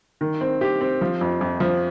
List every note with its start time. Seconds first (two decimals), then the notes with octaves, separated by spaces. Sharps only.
0.21 D#3
0.41 C4
0.61 G4
0.81 C4
1.01 F3
1.21 F2
1.41 F2
1.60 F3